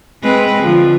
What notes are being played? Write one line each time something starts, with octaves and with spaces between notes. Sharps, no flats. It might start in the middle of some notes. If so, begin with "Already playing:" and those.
G#3 C4 B4
D3 F3